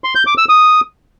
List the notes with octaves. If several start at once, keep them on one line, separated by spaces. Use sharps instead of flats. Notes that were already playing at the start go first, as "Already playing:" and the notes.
C6
G6
D6
E6
D#6